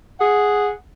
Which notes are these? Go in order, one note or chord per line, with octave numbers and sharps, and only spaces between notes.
G#4 F#5